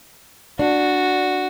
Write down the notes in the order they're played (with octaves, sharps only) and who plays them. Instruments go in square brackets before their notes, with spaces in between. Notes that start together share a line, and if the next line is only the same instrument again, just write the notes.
[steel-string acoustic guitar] D4 [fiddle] F#4